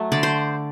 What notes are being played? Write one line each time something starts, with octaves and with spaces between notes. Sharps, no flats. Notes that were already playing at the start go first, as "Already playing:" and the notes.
Already playing: F#3 A3
D3 D5
C5